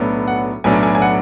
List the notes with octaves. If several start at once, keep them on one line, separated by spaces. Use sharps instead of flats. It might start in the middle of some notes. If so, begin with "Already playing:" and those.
Already playing: B1 A2 F#3 B3 D4
F#5
B1 A2 F#3 B3 D4 G#5
G#5
G#5
F#5